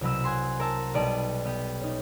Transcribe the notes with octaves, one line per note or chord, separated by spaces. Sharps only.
C2 B2 F#3 B5 E6
F#5 G#5 C6
A#4 E5 A5
B1 G3 B3 D5 A5 D#7
B3 G4
C#4 D#4